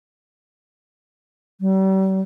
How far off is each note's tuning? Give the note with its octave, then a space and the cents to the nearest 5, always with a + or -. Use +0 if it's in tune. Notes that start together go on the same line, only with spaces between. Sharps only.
G3 -40